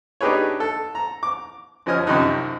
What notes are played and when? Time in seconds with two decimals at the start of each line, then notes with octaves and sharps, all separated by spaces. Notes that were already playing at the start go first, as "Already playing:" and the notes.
0.21 D4 D#4 G4 G#4 B4 C#5
0.60 A4
0.95 A#5
1.23 D6
1.86 F#2 F3 C#4 D#5 G#5 F6
2.06 C2 F#2 C3 F3 D#4 F#6